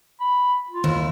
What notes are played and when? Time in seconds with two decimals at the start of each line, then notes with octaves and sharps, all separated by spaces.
0.20 B5
0.70 F4
0.84 D#2 E4